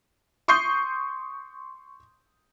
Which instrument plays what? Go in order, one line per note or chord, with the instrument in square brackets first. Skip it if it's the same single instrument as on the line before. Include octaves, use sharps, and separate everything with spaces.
[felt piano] C6 C#6 D#6 G6 C7